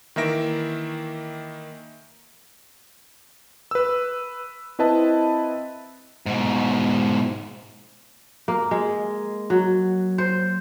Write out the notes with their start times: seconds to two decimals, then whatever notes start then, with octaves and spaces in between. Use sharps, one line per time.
0.16 D#3 E3 A#3 E5 A#6 D7
3.71 B4 E6
4.79 C4 E4 B4 D#5 A5
6.26 G#2 B2
8.48 A#3
8.71 G#3
9.50 F#3
10.18 C5